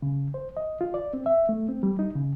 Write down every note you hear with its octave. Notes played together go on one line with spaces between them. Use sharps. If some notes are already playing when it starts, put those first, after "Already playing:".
C#3
C5
D#5
F4
D5
C4
E5
A3
C4
G3
D#4
C#3